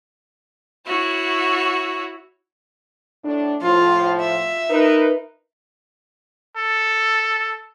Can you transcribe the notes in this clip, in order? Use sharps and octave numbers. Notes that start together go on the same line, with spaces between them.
E4 F#4 C#5
A2 D4
A2 F3 F4
E5
D#4 A#4 B4
A4